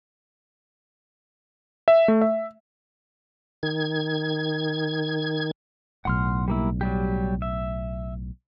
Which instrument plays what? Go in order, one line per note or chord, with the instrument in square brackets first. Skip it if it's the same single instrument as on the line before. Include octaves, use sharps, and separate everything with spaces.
[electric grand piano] E5
A3
E5
[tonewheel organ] D#3 G#6
[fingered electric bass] B1 A2 [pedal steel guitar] F#5 C6 F6
[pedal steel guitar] G3 A#3 E4
F#3 G3 G4
E5